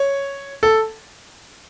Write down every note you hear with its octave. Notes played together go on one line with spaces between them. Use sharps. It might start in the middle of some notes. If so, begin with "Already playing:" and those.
Already playing: C#5
A4